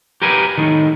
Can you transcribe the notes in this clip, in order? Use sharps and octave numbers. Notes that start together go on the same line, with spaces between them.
G4 A#4 B4 G#5
A2 D#3